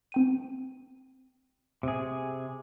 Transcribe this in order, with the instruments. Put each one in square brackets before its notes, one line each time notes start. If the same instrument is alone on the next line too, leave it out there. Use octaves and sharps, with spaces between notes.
[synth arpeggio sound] C4 G5 D#7
[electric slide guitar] C3 G#4